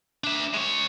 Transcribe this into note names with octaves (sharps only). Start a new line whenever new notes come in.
D4 E5
G#3 C#5